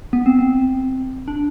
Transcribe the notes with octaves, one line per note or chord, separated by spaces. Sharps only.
B3
C4
C4
D4